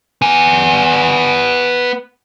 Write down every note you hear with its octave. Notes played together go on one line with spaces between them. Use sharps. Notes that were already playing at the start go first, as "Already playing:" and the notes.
B3 G#5